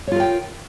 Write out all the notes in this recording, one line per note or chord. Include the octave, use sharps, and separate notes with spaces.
F4 A#4 C#5 G5